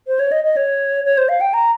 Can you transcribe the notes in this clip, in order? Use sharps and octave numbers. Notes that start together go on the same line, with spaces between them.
C5
C#5
D#5
D#5
C#5
C#5
C5
F5
G5
A#5